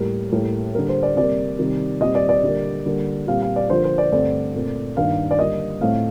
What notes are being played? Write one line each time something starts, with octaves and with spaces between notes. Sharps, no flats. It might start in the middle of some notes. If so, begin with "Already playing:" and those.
Already playing: A2 G3 A#3 A#4
A2 G3 A#3 A#4
D3 G3 A#3 A#4
C5
D5
C3 G3 A#3 D5
C3 D#3 G3
A#2 G3 C4 D#5
D5
D5
D3 G3 A#3
D3 G3 A#3
A#2 G3 C4 F5
F5
D5
D3 F3 A#3 C5
C5
D5
G2 D3 A3 C4 D5
A#2 A3 C4
G2 D#3 A#3 F5
D5
D3 G3 A#3 D#5
A2 A3 C4 F5